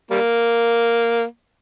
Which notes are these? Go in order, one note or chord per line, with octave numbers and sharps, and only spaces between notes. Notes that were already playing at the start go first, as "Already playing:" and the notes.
G3 A#3